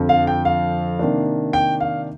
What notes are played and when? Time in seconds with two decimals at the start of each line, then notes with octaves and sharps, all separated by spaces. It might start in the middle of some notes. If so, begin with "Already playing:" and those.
Already playing: F2 D3 F3
0.09 F5
0.27 G5
0.45 F5
0.99 C3 D#3 A#3 D4
1.53 G5
1.80 F5